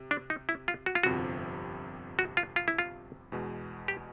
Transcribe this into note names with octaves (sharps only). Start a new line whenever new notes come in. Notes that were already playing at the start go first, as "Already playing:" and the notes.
Already playing: C3
D4
D#4
E4
F4
F#4
F4
G1 F2 C3 F3 F#4
F#4
F4
F4
E4
F4
E2 B2 G#3
G4